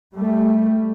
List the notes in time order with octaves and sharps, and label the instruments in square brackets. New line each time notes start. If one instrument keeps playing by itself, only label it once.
[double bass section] G3 A3